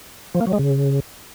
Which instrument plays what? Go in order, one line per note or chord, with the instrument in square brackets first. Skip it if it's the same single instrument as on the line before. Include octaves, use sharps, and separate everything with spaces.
[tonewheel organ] F3
A#3
F#3
G#3
C#3